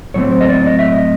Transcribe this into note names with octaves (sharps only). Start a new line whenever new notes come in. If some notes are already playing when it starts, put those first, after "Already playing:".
A2 F#3 A3 C4 C#5
C5
D#5
D5
D#5
E5
D#5